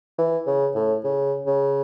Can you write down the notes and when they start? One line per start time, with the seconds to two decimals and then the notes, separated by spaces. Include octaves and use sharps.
0.18 E3
0.47 C#3
0.75 A2
1.04 C#3
1.47 C#3